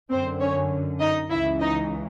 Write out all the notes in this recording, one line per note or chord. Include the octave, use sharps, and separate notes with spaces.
F#2 D3 C4 C5
C#4 C#5
D#4 D#5
C#2 C#3 E3 E4 E5
D#4 D#5